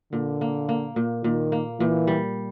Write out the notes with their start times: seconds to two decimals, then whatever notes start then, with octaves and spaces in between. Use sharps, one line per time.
0.12 A#2 D3
0.41 A#3
0.69 A#3
0.96 A#2
1.24 A#2 D#3
1.52 A#3
1.80 A#2 E3
2.07 G3